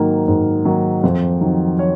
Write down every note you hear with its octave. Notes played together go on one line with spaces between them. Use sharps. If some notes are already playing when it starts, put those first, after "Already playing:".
Already playing: G#2 D#3 F#3 A#3
G#2
D#3 F#3 A#3
F2
D#3 F#3
C#5